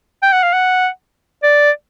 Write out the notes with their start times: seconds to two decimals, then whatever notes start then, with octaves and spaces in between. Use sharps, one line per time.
0.23 G5
0.33 F#5
0.43 F5
0.53 F#5
1.43 D5